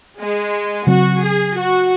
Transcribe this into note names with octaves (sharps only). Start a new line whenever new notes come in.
G#3
C#3 F#3 C4 F#4
G#4
F#4